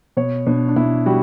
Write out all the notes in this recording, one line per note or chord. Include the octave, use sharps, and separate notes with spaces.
B2 C#5
B2 D4
D4
B2 E4
G3 F#4